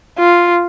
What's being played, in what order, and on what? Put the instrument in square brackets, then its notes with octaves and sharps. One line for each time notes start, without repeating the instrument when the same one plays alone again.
[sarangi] F4